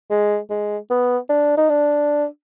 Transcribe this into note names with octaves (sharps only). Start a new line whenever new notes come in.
G#3
G#3
B3
D4
D#4
D4